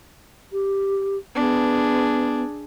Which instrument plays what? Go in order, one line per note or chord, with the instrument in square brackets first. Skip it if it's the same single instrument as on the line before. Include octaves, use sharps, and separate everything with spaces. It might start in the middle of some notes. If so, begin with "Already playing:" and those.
[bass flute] G4
[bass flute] B3 [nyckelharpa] D4 G#4